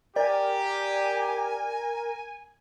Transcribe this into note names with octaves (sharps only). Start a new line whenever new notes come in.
G4 A#4 D5 G#5